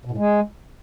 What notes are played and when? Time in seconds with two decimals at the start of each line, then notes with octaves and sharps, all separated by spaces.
0.05 B2
0.11 A2
0.18 G#3